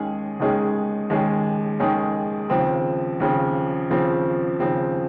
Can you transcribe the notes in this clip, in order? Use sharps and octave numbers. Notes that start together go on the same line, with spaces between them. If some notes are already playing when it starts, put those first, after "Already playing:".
Already playing: D#2 D#3 G#3 C#4 G#4
D#2 D#3 G#3 C#4 G#4
D#2 D#3 G#3 C#4 G#4
D#2 D#3 G#3 C#4 G#4
D#2 C#3 F3 C4
D#2 C#3 F3 C4
D#2 C#3 F3 C4
D#2 C#3 F3 C4